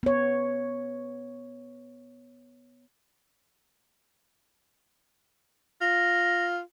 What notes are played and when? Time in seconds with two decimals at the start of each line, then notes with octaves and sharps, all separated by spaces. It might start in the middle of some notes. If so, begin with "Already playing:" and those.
0.03 B3 C#5
5.81 F4 A#6